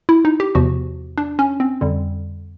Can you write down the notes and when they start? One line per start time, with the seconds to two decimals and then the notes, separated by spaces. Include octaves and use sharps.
0.09 E4
0.25 D#4
0.40 G4
0.55 E2 C3 F3 F#4
1.18 D4
1.39 C#4
1.60 C4
1.81 F2 D3 G3